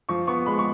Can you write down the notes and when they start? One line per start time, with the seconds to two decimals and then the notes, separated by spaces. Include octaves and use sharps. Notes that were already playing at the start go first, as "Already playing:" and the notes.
0.09 F3 C#6
0.27 B3 C#6
0.46 G#3 B5
0.59 C#6